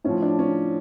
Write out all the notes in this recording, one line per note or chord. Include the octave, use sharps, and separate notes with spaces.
A2 F3 C#4
D4
C#4